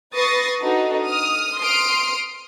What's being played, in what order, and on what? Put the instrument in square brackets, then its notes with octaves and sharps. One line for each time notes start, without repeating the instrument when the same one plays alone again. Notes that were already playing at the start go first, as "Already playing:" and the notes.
[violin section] B4 C#6 D#6 A6 A#6 C7
D4 D#4 F#4 A4 B4
D#6 F6
C6 D#6 F6 C7 D7